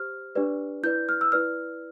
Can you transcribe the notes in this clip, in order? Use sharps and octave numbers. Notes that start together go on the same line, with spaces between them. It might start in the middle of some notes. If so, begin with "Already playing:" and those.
Already playing: G4 C5 F6
D4 G4 B4 D5
E4 B4 D5 G6
F6
E6
E4 B4 D5 F6